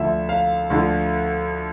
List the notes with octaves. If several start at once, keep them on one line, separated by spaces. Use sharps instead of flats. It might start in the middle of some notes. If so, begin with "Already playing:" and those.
Already playing: D2 D3 F3 E5
F5
D2 D3 F3